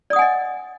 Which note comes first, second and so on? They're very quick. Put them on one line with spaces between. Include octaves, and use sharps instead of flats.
D5 D#6 F#5 G#5 D#5